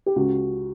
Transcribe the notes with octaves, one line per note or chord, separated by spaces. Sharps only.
G4
C#2 F#4